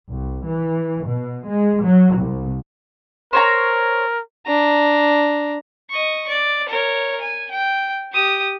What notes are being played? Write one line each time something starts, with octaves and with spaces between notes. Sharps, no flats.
C2
E3
B2
G#3
F#3
C2
A#4 C5 C#5 A#5
D4 A#5
D#5 C#6
D5
A#4 C#5
G#5
G5
G4 D#6